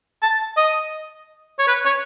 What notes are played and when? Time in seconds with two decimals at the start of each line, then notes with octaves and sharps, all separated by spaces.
0.23 A5
0.57 D#5
1.59 C#5
1.68 B4
1.85 C#5